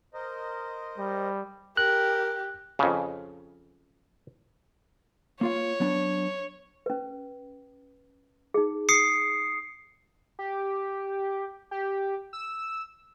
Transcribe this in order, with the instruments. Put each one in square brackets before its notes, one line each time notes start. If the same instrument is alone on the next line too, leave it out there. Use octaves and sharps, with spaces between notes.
[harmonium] A#4 C5 D#5
[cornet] G3
[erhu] G4 [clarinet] A#4 [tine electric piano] F#6
[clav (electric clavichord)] F2 C#3
[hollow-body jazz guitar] A#3 F4 F5 [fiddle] C#5
[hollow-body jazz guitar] F#3 B3 D4
[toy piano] C#4 B4
D#4 G#4
[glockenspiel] D#6 C7 C#7
[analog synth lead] G4
G4
E6